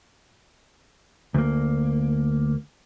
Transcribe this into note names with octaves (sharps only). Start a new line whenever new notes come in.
D2 A#3